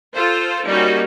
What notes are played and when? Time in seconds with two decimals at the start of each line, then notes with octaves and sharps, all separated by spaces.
0.14 F4 A4 C5
0.66 G3 A#3 C#4 D#4 F#4